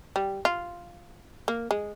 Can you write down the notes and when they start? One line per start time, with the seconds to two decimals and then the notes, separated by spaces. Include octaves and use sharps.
0.16 G3
0.45 F4
1.48 A#3
1.71 G#3